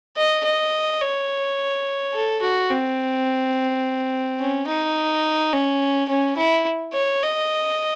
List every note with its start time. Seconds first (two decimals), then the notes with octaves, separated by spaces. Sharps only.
0.17 D#5
0.45 D#5
1.01 C#5
2.14 A4
2.42 F#4
2.70 C4
4.40 C#4
4.68 D#4
5.53 C#4
6.09 C#4
6.37 E4
6.94 C#5
7.22 D#5